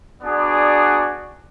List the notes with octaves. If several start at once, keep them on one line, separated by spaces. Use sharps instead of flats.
B3 D4 F#4 G#4 D5